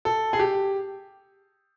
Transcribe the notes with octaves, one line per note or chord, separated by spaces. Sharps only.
A4
G#4
G4